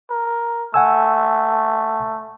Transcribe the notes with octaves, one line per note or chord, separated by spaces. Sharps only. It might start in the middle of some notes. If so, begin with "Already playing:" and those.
A#4
A3 F#5 G#5 E6